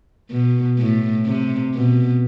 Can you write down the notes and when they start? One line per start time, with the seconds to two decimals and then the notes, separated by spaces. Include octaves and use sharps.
0.30 B2
0.78 A2
1.26 C3
1.75 B2